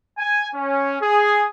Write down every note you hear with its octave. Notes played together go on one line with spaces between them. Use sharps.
G#5
C#4
G#4